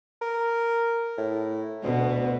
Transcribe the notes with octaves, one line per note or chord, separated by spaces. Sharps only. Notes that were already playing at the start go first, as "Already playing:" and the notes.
A#4
A2
D2 B2